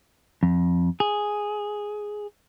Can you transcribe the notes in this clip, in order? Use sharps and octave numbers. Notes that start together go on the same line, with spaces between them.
F2
G#4